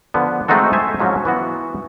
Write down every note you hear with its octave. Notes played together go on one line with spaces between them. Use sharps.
D3 F3 B3
G#3 A3 C4 D#4 F#4 A4
C5 E5 G#5 A5
G#2 F3 F#3 C#4
E3 B3 F#4